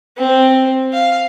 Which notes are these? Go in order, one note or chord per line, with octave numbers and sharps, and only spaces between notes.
C4
F5